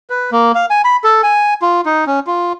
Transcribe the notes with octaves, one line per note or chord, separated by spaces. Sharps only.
B4
A#3
F5
G#5
B5
A4
G#5
F4
D#4
C#4
F4